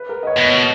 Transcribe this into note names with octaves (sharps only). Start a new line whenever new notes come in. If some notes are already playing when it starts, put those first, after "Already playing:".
Already playing: B4
A#4
D#5
C#5
B2
C#5